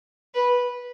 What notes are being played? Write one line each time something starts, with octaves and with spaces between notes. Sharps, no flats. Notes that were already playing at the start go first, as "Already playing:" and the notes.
B4